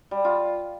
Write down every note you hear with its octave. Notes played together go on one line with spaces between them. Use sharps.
G3
F4